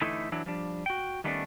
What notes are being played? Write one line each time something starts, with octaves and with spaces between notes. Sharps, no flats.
D3 E3 A3 D#4 E4
E3 F#3 D4 E4
F3 G3 D4
F#4 G5
D#3 G3 A3 B3 C#4 D4